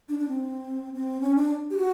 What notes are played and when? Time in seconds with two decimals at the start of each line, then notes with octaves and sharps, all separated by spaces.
0.09 D4
0.19 D4
0.28 C4
0.93 C4
1.21 C#4
1.35 D4
1.71 G4
1.77 F#4